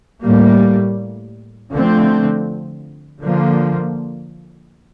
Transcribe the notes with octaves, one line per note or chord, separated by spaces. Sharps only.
A2 G3 A#3
D3 F3 A3 C4
D3 F3 A#3